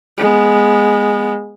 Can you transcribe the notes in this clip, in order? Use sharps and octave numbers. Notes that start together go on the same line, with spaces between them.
G#3 B3